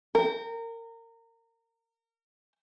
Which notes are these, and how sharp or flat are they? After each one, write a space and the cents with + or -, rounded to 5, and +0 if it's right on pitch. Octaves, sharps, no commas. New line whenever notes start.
A#4 -25 G5 +0